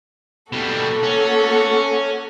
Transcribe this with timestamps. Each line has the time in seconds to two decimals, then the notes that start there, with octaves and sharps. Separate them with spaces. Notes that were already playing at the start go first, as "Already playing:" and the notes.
0.52 B2 G3 A#3 F#4 A4
1.03 C#4